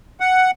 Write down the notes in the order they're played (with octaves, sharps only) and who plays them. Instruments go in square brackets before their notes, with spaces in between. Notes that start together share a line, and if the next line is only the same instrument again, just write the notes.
[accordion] F#5